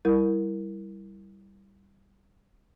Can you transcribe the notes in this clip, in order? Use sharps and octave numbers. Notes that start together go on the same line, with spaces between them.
G3 E4 A#4